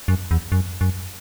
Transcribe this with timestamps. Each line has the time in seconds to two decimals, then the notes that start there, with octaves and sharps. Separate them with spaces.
0.08 F#2
0.31 E2
0.52 F#2
0.81 F#2